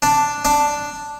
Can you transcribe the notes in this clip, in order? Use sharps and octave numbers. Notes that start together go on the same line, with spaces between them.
D4 D5
D4 D5